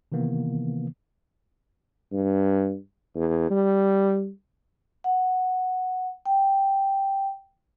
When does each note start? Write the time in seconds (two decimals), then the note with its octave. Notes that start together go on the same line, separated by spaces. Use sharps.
0.12 C3 D#3 E3 A#3 B3
2.12 G2
3.15 E2
3.50 G3
5.04 F#5
6.26 G5